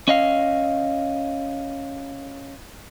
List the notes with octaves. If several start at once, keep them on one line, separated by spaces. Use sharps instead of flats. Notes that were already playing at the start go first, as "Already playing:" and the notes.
C#4 D#5 F5